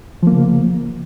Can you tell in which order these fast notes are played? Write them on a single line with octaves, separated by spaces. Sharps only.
F3 A#3 C#3